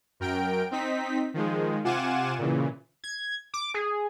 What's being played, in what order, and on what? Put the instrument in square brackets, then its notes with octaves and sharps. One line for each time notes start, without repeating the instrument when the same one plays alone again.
[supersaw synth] F#2 A#4 G5 D7
C4 D#4 B6
D#3 F3 G#3
C3 F4 F#5 G#5 D6 E7
A#2 C#3 E3
[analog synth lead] G#6
D6
G#4